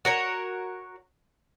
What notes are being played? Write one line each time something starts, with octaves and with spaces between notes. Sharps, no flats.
F#4 A#4 C#5